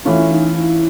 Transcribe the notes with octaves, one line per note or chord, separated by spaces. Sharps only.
E3 A3 C#4 E4 F4
D#4
E4